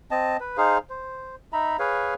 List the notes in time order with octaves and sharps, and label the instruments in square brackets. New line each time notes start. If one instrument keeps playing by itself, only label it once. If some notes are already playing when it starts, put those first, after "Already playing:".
[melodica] C4 D#5 A5
B4
D#4 G#4 C5 F5
C5
D#4 E5 A#5 B5
G#4 B4 C#5 F5